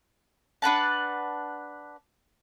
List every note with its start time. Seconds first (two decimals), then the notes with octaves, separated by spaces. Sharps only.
0.62 D4 B4 F#5 A5